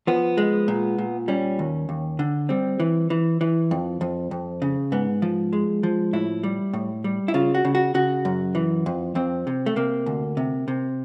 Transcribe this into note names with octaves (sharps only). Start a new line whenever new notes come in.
F3 B3
G#3
A#2
A#2
G3 C#4
D#2
D#2
D3
G3 C4
E3
E3
E3
F2
F2
F2
C#3
G#2 B3
F3
G#3
F3
A2 E4
G3
A2
G3
E4
C#3 F4
F#4
C#3
F#4
C#3 F#4
F#2
E3
F2
F2 C4
C3
A3
C3 A#3
D2
C3
C3